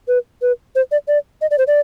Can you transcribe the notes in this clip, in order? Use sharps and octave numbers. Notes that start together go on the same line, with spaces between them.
B4
B4
C5
D5
D5
D#5
D5
C5
D5